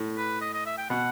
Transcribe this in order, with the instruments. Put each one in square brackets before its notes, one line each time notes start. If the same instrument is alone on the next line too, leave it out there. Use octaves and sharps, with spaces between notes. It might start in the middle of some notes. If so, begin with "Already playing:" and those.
Already playing: [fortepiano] A2
[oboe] B4
D#5
D#5
E5
G5
[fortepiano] B2 [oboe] F#5